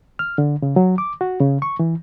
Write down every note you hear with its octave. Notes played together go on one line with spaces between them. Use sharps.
F6
D3
C#3
F#3
D6
F#4
C#3
C#6
E3